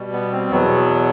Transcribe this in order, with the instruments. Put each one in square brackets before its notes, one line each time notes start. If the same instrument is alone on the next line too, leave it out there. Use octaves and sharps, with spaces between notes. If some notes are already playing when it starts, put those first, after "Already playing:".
Already playing: [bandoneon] B2 G3
B3
C4
E2 B2 F#3 B3